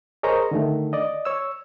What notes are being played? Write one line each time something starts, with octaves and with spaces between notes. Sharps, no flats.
G#4 A#4 C5 C#5 D#5 A#5
D3 D#3 A3
D5 D#5
C#5 E6